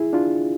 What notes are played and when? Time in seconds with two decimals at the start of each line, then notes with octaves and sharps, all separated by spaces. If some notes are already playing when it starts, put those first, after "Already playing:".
Already playing: E4 G#4
0.13 D4 F4